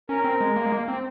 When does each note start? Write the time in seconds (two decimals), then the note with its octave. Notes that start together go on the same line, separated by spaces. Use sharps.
0.09 C#4 A#4
0.24 C4
0.41 G#3
0.56 A#3
0.66 G#3
0.72 A#3
0.88 C4